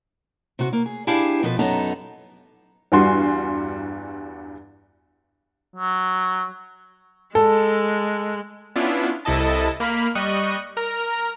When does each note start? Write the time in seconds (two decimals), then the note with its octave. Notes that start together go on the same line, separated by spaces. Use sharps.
0.59 C3 F#4
0.73 A#3
0.86 G#4
1.07 D4 E4 G4 G#4 F5 A5
1.43 B2 F3 A4 B4
1.59 F#2 B3 D#4 A4 A#5
2.92 E2 G2 G3 F#4 G#5 C6
5.76 F#3
7.35 G#3 A4
8.76 B3 C#4 D4 E4 F4
9.25 C2 C3 E4 A4 D#5 A5
9.80 A#3 B5 F6 B6
10.15 G3 D#5 C#6 F#6 D#7
10.77 A#4 A#5 F6